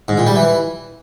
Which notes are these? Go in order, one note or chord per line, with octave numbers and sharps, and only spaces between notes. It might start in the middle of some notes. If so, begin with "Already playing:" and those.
G#2
A#2
G3
E3